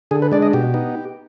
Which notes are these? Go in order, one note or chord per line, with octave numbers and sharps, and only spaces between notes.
D3 G#4
B4
G#3 D4 D5
D#5
B2 G4
B3 D#4